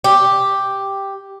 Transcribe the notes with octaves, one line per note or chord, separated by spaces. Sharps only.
G4